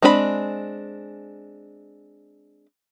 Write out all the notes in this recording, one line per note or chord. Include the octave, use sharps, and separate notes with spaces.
G#3 C4 D4 B4 B5